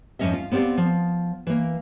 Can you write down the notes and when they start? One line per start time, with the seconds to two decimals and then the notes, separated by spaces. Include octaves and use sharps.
0.19 F2 G#2 D#3 C#4 D#5 E5
0.34 F4
0.52 B3 C4 G4 D5 F5
0.78 F3
1.47 E3 A#3